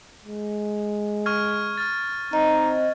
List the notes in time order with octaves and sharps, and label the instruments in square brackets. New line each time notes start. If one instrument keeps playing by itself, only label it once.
[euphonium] G#3
[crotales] C#6 F6 G#6
F6 A6
[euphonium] C4 [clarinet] D#4 [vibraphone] D#5